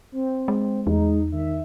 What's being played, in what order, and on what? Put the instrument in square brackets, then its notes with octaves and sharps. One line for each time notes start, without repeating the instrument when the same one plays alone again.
[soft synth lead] C4
[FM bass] G#3
[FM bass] E2 [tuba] G#3 [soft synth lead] D#4
[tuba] D#3 [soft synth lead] E5